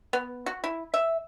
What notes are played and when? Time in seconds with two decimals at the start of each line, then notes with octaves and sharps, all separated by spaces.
0.13 B3
0.46 F#4
0.64 E4
0.94 E5